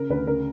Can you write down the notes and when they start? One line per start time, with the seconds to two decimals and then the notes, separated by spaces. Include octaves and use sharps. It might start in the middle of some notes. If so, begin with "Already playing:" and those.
Already playing: C#3 A#4
0.10 D2 B4
0.27 C#3 A#4